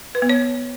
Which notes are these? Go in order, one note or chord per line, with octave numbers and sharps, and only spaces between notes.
B4
B3
C#5